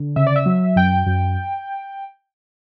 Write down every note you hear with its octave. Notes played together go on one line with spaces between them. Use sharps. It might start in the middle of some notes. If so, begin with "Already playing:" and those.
Already playing: D3
C#3 E5
D5
E5
F#3
F#2 G5
F#2